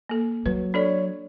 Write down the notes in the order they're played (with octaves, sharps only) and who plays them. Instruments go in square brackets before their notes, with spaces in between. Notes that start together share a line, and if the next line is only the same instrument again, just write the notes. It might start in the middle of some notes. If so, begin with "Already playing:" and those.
[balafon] A#3 A4
[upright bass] F#3 [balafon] B4
[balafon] D4 A4 D5 [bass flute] C#5